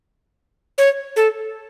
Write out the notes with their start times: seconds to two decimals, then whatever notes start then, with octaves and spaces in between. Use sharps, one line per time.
0.78 C#5
1.16 A4